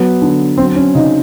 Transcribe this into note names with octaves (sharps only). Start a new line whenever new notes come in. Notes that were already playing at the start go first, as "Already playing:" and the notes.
Already playing: F#3 B3
D3
F#3 C4
C#4
C#3 D#4